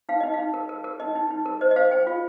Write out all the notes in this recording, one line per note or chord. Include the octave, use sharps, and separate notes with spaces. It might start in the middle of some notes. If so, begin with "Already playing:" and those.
D#4 F5
D#4 D#5
F5
D#4
A#4
A#4
A#4
D#4 D#5
D#4
D#4
A#4
C5 D#5
D#5
C5 F5
C5 G5
F4 F5